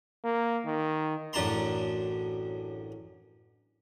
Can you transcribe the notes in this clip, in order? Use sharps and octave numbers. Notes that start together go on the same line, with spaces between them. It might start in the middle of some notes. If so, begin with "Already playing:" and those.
A#3
D#3
A1 F#2 D4 A5 A#5 C6